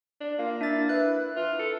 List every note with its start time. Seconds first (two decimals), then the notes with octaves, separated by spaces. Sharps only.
0.21 D4
0.39 A#3 F4
0.61 D4 E4 A6
0.89 E4 B4 F#6
1.36 E3 F4
1.59 A4